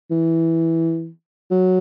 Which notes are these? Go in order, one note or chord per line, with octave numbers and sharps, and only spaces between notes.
E3
F#3